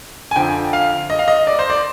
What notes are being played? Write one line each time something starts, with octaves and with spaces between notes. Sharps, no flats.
G#5
F2 D3 F3 G5
F5
D#5
F5
D#5
D5
C5
D5